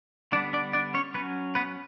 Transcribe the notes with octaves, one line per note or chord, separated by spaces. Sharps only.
D3 G3 B3 D4 D5
D4 D5
D4 D5
C#4 C#5
F#3 B3 C#4 B4
B3 B4